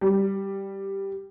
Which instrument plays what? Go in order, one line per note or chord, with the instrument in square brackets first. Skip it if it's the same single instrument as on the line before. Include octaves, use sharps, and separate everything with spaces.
[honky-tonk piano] G3